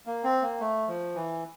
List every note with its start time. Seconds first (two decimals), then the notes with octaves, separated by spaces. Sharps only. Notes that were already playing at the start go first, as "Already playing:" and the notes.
0.06 A#3
0.24 C4
0.42 A#3
0.60 A3
0.88 F3
1.15 E3